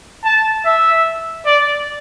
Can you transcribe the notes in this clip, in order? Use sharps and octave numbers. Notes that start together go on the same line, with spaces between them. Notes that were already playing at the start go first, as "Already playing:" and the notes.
A5
E5
D5